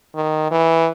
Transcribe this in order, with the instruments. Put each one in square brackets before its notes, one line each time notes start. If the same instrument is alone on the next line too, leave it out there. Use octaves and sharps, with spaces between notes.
[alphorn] D#3
E3